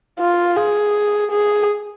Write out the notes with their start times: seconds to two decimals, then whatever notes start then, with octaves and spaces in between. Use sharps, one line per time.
0.20 F4
0.57 G#4
1.31 G#4